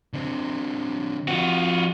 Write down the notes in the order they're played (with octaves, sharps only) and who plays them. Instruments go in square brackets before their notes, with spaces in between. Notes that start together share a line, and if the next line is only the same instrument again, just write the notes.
[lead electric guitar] D3 C4
[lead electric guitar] F3 C4 [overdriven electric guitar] F4 F#4